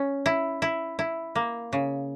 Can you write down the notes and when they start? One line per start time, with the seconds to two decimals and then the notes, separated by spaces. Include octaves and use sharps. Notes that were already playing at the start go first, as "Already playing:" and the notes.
Already playing: C#4
0.26 E4
0.62 E4
0.99 E4
1.35 A#3
1.73 C#3